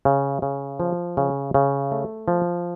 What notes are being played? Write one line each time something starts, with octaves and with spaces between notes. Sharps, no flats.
C#3
C#3
F3
C#3
C#3
A3
F3